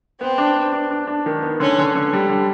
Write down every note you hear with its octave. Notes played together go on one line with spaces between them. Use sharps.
B3 C4
D4
B3
D4
D4
D4
D#3
B3
D3 C#4
D3
D3
G3
D3